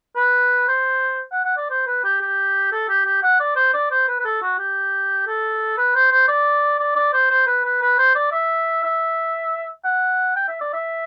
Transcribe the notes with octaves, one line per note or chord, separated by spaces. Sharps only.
B4
C5
F#5
F#5
D5
C5
B4
G4
G4
A4
G4
G4
F#5
D5
C5
D5
C5
B4
B4
A4
F#4
G4
A4
B4
C5
C5
D5
D5
D5
C5
C5
B4
B4
B4
C5
D5
E5
E5
F#5
G5
E5
D5
E5